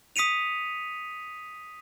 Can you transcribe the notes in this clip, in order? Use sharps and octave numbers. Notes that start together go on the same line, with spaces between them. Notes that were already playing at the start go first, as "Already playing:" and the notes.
D#6 B6 C#7 D#7 F7